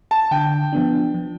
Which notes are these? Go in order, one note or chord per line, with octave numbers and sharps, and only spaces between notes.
A5
D3 G5
F3 B3 D4
F3